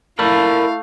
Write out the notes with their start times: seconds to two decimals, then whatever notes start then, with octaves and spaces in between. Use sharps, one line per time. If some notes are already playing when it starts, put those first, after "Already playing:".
0.19 A3 E4 A#4 D5 F5 B5